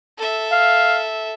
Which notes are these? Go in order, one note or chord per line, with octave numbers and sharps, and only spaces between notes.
A4 E5
F5